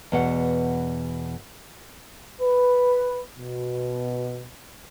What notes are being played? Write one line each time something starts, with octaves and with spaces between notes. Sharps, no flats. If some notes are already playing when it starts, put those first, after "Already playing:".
E2 B2 F#5
B4
B2